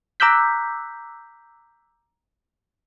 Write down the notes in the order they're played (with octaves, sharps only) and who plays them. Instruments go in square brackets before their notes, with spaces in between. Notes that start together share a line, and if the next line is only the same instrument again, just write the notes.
[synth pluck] A#5 D6 E6 F#6 G6 B6